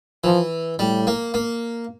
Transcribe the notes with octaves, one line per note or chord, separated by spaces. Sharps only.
E3 F3
A2 G3
A#3
A#3